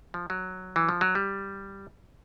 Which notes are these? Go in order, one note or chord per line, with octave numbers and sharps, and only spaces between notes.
F3
F#3
E3
F3
F#3
G3